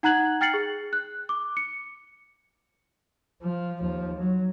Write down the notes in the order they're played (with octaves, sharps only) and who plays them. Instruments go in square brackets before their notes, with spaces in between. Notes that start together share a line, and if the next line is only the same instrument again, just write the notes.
[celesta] D#4 F#5 A#5 F#6 G#6 F#7
G5 F6 A6 C7 C#7 F#7
G#4
F#6
D6
C#7
[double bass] F3
D#2 F3
F#3